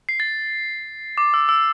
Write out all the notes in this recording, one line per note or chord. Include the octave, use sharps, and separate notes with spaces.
C7
A6
D6
E6
E6